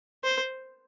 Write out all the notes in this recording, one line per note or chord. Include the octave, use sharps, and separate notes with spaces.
C5